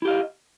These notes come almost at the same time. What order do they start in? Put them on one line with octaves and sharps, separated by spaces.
E4 G4 F5 D#5